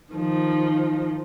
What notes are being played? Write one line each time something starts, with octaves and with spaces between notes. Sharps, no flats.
D#3 F3